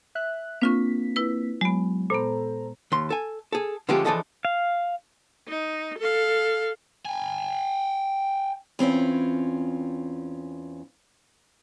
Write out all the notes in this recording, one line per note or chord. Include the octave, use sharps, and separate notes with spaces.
E5 F#6
A#3 C4 D4 F4 C#6 B6
E4 B4
F#3 G#3 B3
A#2 B3 A4 C5 A#5
D#2 C6
A4 G#5
G#4 A4
D3 F3 G#3 A3 C#4 G4
E3 F3 D4 G#4 A4 D#5
F5
D#4
A4 F5
G5 G#5
E2 C4 C#4 F4